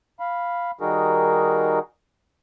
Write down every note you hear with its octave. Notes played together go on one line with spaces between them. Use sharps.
F5 B5
D#3 G3 D#4 F#4 G#4 A#4